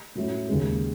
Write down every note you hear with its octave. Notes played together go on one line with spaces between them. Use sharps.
A2 F#3 A3 C#4 E4
D#2 C#3 G#3